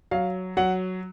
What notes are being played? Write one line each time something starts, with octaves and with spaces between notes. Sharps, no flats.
F#3 F5
F#3 F#5